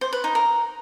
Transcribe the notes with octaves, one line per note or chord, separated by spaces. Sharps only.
C5
B4
D#4
A#4